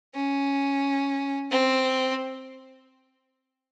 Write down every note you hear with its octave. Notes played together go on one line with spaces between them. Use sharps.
C#4
C4